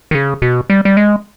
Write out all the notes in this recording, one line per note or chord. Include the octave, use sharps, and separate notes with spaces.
D#3
C#3
B2
G3
G3
G#3